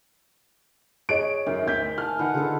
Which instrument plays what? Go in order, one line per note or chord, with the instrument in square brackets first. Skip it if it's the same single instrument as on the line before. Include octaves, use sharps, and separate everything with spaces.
[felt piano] G#4 C#5 D#5 [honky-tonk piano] D7
[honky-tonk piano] F#2 [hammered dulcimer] D#3
[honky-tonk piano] D2 [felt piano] E5 G6 B6
[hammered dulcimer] G#5 A5 [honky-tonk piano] F6
[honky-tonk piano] D#3 [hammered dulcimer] B4 F#5 A5
[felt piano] D3 G#4 [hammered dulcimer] F4 A4